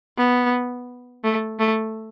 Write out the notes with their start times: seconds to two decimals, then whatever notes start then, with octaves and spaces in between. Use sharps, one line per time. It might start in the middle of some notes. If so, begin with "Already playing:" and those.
0.17 B3
1.24 A3
1.59 A3